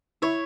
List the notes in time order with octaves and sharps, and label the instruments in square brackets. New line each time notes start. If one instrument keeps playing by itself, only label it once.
[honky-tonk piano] E4 [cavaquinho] C#5